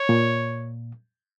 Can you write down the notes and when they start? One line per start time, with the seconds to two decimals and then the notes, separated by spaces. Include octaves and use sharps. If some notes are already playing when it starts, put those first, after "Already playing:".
Already playing: C#5
0.09 A#2